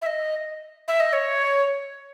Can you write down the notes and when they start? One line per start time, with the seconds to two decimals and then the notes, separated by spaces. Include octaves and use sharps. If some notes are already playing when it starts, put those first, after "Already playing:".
0.02 E5
0.06 D#5
0.88 E5
1.00 D#5
1.13 C#5